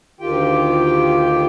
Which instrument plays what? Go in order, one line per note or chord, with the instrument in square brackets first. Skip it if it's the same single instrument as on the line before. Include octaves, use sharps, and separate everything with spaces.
[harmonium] D2 D#3 F4 G4 G5